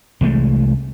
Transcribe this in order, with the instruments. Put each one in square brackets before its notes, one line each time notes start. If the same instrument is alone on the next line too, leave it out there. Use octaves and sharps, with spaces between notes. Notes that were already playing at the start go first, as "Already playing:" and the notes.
[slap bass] C2 E3 G#3 A3